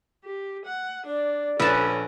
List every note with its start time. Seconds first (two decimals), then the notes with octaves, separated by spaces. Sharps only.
0.24 G4
0.66 F#5
1.06 D4 D5
1.60 A#1 C#4 A4 B4 A5